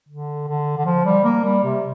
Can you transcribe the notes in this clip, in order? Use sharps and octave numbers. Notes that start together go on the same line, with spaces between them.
D3
D3
D3
F3
G3
A#3
G3
C3